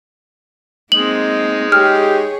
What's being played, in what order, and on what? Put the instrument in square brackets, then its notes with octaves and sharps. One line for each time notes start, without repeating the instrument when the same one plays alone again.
[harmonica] G#3 D#4 [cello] A#3 C4 [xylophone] F#7
[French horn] G4 [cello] G#4 C#5 [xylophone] F6